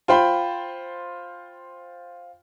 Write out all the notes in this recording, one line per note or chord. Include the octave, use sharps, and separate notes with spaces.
F4 C5 G5 B5